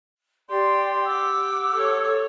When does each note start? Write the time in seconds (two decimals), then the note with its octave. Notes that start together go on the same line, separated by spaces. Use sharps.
0.49 G4 D5 G5 C6
1.05 F#5 D6 E6
1.73 A4 C#5